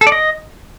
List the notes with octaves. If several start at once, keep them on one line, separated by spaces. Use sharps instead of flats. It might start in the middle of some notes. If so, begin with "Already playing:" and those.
A4
D5
D#5